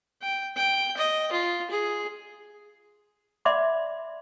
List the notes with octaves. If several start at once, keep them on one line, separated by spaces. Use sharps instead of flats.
G5
G5
D#5
F4
G#4
D5 E5 F#5 B5 C6 D6